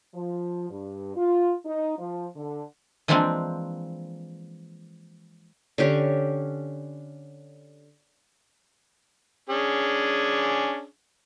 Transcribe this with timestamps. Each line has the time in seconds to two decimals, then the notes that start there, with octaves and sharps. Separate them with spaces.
0.14 F3
0.70 G2
1.17 F4
1.66 D#4
1.98 F3
2.35 D3
3.08 E3 F3 G#3 A#3 C4 D4
5.78 D3 C#4 G4 C#5
9.50 C#4 D4 G#4